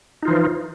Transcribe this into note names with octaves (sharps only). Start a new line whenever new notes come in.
E3 F3 D#4 F4